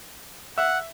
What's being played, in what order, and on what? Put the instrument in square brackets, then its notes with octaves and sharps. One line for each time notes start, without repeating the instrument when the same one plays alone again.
[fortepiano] E5 [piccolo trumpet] F#5